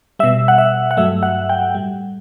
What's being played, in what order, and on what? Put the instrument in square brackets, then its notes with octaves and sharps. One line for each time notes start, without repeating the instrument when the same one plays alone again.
[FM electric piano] B2 G3 E5
F#5
E5
F#5
G2 F#3 A3 E5
F#5
G5
A2 G3